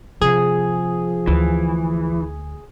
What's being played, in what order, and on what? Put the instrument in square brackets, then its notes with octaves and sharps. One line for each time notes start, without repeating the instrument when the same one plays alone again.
[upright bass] C3 [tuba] F3 [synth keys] G#4
[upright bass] D2 [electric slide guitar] E3